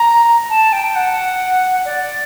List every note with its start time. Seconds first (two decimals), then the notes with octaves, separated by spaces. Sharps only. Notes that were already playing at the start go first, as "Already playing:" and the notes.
Already playing: A#5
0.50 A5
0.73 G5
0.95 F#5
1.85 D5